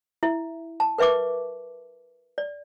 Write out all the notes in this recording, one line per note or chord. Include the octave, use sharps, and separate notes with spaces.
E4 E5
A5
A#4 B4 E5 C#6 D6
D5